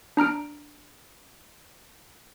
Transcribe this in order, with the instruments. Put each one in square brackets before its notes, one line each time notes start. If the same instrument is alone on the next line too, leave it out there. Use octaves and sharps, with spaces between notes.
[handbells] D4 A#5 F6 D7